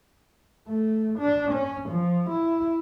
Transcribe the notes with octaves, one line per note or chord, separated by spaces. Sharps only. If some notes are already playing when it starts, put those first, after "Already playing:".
A3
D4
C#4
F3
E4